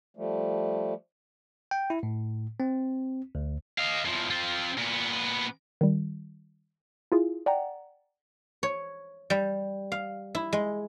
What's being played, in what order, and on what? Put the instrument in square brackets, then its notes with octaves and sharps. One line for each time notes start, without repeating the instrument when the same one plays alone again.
[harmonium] F3 G3 A3
[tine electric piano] G5
E4
A2
C4
D2
[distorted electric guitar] D#5 F5
E2 F3
C4 F4
A#2 B3
[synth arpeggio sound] D#3 G3
E4 F4 G#4
D5 F#5 G5 A#5
[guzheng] C#5
G3
F5
E4
G#3